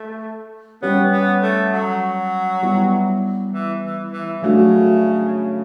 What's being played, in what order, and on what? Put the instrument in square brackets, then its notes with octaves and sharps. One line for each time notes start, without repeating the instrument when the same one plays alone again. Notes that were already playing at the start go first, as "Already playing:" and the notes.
Already playing: [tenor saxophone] A3
[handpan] G3 C#4 G4 C#5 [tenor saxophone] B3
[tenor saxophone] B3
A3
F#3
[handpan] G3 B3 E4 G4
[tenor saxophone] E3
E3
E3
[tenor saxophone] C#3 [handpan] F#3 A3 D4 F#4